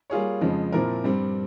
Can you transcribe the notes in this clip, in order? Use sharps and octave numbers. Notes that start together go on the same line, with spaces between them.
G3 A#3 F4 G#4 C#5
F2 C#3 F3 G#3
A#2 F3 C4 E4 A#4
G2 G3 C4